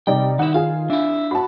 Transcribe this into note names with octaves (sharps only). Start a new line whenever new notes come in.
C3 G3 D#4 D5 G5
D#3 D#4 E4 F#5 E7
F4 G#4 F5
D4 E4 E5
F#4 A5 B5